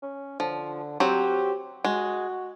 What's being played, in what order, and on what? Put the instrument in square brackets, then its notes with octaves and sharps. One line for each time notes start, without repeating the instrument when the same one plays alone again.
[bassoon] C#4
[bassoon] D3 [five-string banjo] F3
[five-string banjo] F#3 C4 [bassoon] G4
[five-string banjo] G#3 [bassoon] F#4